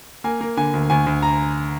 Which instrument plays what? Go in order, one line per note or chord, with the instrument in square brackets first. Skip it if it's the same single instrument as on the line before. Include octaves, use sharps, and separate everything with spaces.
[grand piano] A#3 G#5
A#3
D3 G#5
D2
D2 G#5
D2
A#5